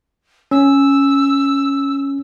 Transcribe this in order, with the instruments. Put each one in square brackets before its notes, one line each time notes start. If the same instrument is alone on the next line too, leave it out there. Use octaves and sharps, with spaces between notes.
[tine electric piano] C#4 [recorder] E6